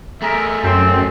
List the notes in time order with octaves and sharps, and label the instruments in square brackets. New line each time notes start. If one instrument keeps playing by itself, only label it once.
[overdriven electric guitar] A3 G#4 [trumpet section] A#4 E5
[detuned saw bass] F#2 [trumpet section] C4